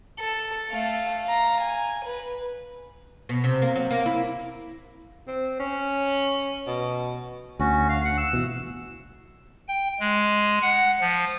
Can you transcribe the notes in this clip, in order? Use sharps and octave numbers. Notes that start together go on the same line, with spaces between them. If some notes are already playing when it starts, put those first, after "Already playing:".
A4
A3 F5
F5 A#5
G#5
B4
B2
C3
A#3
F#3
A#3
E4
C4
C#4
B2
D2 C#4 F#4
F5
F#5
E6
B2 E3
G5
G#3
F#5
F3